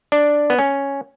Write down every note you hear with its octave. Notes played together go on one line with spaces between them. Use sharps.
D4
B3
C#4